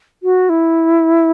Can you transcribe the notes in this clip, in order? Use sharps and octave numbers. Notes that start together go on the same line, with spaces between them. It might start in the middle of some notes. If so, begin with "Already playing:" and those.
F#4
E4